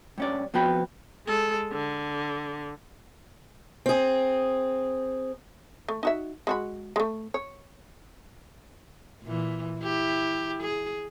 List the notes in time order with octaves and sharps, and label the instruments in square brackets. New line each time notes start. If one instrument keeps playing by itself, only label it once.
[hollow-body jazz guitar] G2 C#4 D5
F2 B2 B3 F#4 G5 B5
[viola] G#3 A4
D3
[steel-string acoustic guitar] C4 G#4
[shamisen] A3
D#4 F#4 E5
G#3 F#4 B5
G#3 A3
C#5
[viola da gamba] A#2 E3
E4 G4
G#4